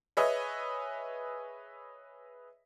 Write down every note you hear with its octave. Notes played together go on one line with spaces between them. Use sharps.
G#4 B4 C#5 D#5 E5